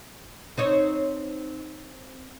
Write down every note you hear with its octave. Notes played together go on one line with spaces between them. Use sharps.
C4 D#4 C#5